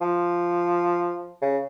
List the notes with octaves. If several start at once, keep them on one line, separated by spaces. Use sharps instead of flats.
F3
C#3